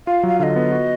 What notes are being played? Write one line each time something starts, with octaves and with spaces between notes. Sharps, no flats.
F4 F5
F#3 F5
D3 D#5 F5
B3
F#4